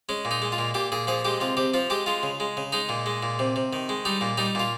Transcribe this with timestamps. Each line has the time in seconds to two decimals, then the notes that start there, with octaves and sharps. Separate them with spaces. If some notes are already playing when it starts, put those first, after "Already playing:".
0.09 G#3 C#4
0.25 A#2
0.31 D#4
0.42 G#3
0.52 F4
0.58 A#2
0.74 A#2 G4
0.92 A#2 G#4
1.07 F3 G#4
1.25 G#3 G4
1.40 C3 F4
1.57 C3 G4
1.74 F3 F4
1.90 G#3 G4
2.06 G#3 F4
2.23 C#3
2.40 G#3
2.57 C#3
2.72 G#3 D#4
2.89 A#2
3.06 G#3
3.23 A#2
3.39 C3
3.56 C3
3.73 D#3
3.89 G#3
4.05 G3 D#4
4.21 A#2
4.38 G3 D#4
4.55 A#2 F4